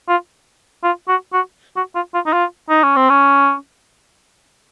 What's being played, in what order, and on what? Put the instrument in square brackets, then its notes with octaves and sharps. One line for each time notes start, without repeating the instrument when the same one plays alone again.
[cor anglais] F4
F4
F#4
F#4
F#4
F4
F4
D#4
F4
D#4
C#4
C4
C#4